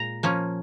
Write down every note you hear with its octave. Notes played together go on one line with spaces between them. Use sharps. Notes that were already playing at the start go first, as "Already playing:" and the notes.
Already playing: A#2 G#3 A#5
F3 A#3 C#4